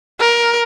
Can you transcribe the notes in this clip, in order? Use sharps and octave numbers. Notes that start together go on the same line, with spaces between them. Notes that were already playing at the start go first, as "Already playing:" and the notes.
A#4